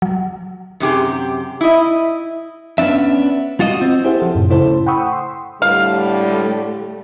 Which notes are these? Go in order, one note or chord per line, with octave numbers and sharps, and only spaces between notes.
F#3
F#2 C3 G4 G#4
E4 D#5
B3 C#4 D4 E5
F4 F#4 D#5
C4
E4 G4 G#4 C5 E5 F#5
F3 A4
F#2 A2 C3
C#3 A3 E4 A4 C5
F#5 G5 B5 C#6 D#6 E6
C6
A2 D3 G3 A3 F5